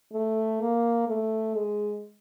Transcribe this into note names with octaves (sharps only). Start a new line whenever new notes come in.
A3
A#3
A3
G#3